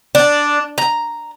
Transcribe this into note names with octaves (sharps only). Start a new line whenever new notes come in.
D4
A#5